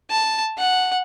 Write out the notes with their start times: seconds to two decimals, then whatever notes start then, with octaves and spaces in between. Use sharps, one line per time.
0.10 A5
0.58 F#5